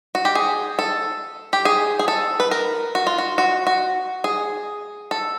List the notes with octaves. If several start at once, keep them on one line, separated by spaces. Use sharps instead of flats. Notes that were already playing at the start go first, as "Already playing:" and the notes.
F#4
G4
G#4
A4
G4
G#4
G#4
A4
B4
A#4
F#4
F4
F#4
F#4
F#4
G#4
A4